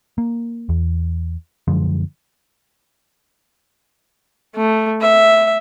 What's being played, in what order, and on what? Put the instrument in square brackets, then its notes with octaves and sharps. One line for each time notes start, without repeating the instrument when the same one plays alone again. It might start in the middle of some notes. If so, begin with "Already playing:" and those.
[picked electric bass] A#3
E2
F#2 D3 F3 G#3
[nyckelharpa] A3
E5